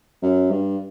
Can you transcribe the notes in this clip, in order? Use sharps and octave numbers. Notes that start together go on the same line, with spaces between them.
F#2
G2